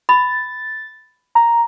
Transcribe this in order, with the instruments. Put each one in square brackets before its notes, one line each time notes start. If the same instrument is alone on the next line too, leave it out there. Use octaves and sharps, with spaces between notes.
[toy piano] B5 [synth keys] A6
[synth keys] A#5